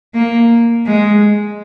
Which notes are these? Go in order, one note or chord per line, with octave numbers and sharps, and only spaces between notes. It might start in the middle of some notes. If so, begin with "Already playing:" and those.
A#3
G#3